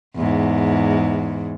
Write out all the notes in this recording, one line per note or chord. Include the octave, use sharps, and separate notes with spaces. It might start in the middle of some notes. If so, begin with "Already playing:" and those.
E2 G#2